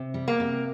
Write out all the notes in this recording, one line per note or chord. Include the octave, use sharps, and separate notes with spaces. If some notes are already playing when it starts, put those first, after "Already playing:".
Already playing: C3
G3
A#3
C3